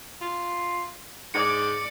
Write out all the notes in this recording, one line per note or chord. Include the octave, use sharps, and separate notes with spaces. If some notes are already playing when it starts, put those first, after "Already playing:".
F4
G#2 D5 C#7